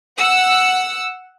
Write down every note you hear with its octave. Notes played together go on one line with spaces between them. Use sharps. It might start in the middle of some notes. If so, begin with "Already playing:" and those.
F#5 E6